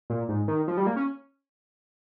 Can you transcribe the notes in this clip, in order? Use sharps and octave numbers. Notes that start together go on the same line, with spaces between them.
A#2
G#2
D#3
F3
G3
A#3
C#4